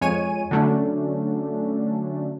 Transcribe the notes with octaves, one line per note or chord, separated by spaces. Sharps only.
F2 G#3 C#5 G#5 D#7
D3 F#3 A3 C#4 D4